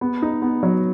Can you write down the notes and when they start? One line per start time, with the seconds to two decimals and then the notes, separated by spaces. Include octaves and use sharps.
0.01 B3
0.22 D#4
0.42 B3
0.63 F#3